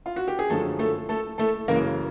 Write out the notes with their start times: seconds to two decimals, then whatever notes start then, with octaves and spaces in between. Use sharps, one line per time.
0.06 F4
0.16 F#4
0.28 G4
0.39 G#4
0.50 F#2 D3 F3 G#3 A3 A4
0.79 A3 A4
1.09 A3 A4
1.38 A3 A4
1.68 F#2 C#3 E3 G#3 A#3 A#4